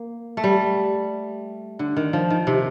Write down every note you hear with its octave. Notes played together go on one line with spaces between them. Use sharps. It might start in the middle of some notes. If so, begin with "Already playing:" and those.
Already playing: A#3
A3
G3
D3
D#3
F3
D#3
C3